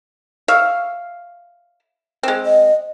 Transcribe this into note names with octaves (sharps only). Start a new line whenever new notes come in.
C#5 E5 F5
G#3 C4
D#5